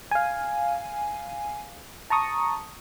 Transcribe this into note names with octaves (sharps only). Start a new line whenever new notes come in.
F5 G#5
A5 A#5 C#6 D#6